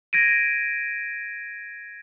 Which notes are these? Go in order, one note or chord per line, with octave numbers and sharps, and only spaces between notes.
G#6 A#6 D7 D#7